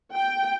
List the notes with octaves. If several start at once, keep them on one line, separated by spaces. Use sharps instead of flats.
G5